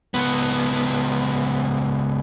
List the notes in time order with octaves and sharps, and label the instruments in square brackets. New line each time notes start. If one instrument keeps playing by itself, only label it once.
[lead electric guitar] C#2 B3